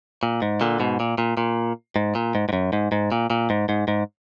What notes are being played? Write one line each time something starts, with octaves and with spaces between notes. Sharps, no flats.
A#2
G#2
A#2 D3
G#2 B2
A#2
A#2
A#2
G#2
A#2
G#2
G#2
F#2
G#2
G#2
A#2
A#2
G#2
G#2
G#2